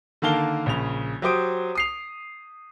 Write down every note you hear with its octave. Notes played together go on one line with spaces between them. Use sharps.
D3 D#3 A#3 F5 A5 G7
A#1 C#3 F7
F#3 G4 C5 D#6 D7
D#6 C7 F7